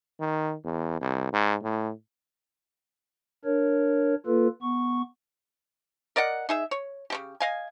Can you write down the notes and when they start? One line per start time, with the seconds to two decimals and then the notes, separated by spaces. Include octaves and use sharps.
0.20 D#3
0.65 E2
1.01 C2
1.33 G#2
1.63 A2
3.45 D4 A#4 C#5
4.26 A#3 F4 A4 B4
4.62 B3 C#6
6.16 A#4 D5 D#5 F#5
6.49 D#4 G#4 E5
6.71 C#5
7.10 C#3 C#4 G4
7.40 D#5 F5 G#5